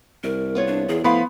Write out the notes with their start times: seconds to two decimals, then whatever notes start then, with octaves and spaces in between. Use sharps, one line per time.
0.24 C2 A#4
0.55 B3 F4 C#5
0.67 D4
0.89 E2 G#4
1.04 A2 F3 B3 E4 F5 B5 C6